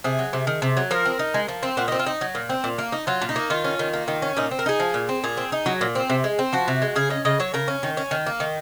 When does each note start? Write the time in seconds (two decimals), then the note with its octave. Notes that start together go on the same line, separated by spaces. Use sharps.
0.04 C3 G#4
0.19 F#3
0.33 C3
0.47 D#3
0.62 C3
0.77 F#3
0.91 F3 A#4
1.05 C4
1.19 D#4
1.34 G#3
1.48 F3
1.63 C4
1.77 A#2 F#4
1.88 C4 D#4
1.99 F4
2.06 D#4
2.21 F#3
2.35 A#2
2.49 C4
2.64 A#2
2.78 A#3
2.92 D#4
3.07 F#3 F4
3.22 A#2
3.29 D#4
3.36 A#3
3.50 D#3 F4
3.64 C#4
3.79 D#3
3.94 A#3
4.08 D#3
4.22 C#4
4.37 A#2 D#4
4.51 C4
4.59 A#4
4.66 D#4 G#4
4.80 F3
4.94 A#2
5.09 C4
5.24 A#2 G#4
5.37 C4
5.52 D#4
5.66 F#3
5.81 A#2
5.95 C4
6.10 C3
6.24 G#3
6.39 C4
6.53 F3 F#4
6.68 C3
6.82 G#3
6.96 C#3 G#4
7.10 C#4 D#5
7.25 C#3 D#5
7.40 F#3 C#5
7.54 C#3 A#4
7.68 C#4
7.83 D#3
7.97 C#4
8.11 D#3
8.26 A#3
8.40 D#3